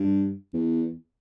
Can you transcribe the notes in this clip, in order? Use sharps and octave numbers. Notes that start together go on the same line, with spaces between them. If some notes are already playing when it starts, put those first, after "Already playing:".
Already playing: G2
E2